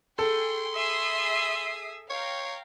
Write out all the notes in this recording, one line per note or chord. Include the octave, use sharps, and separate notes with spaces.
G#4 A4 G5 C6
G#4 E5 D#6 C7
C#5 F5 G5 A#5